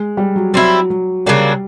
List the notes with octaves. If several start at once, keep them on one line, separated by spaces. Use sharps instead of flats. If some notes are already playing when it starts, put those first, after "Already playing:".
Already playing: G#3
G3
F#3
F#3 G3 C4 E4
F#3
C#3 F#3 G3 A#3 D4